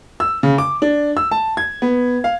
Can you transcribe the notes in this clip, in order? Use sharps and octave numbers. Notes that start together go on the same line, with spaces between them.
E6
C#3
D6
D4
E6
A5
G#6
B3
F5